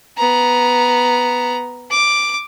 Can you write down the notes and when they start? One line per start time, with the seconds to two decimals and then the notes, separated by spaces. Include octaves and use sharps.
0.17 B3 A#5
1.91 D6